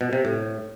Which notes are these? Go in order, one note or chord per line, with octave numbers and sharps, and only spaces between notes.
B2
C3
A2